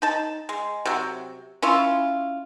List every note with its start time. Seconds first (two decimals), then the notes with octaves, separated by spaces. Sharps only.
0.02 D#4 A5
0.49 G#3
0.85 C3 F#3
1.62 C#4 E4 F4